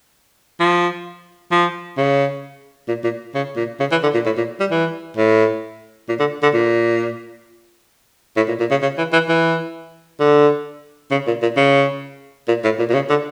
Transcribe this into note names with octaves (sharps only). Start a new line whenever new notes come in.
F3
F3
C#3
A#2
A#2
C#3
A#2
C#3
E3
D3
A#2
A2
A#2
G3
E3
A2
A#2
D3
D3
A#2
A2
A#2
A#2
C#3
C#3
E3
E3
E3
D3
C#3
A#2
A#2
C#3
A#2
A2
A#2
A#2
C#3
D3